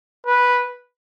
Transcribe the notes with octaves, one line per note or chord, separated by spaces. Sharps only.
B4